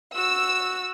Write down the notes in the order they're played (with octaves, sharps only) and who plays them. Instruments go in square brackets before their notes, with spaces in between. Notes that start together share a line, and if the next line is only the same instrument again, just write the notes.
[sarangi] F#4 [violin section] E6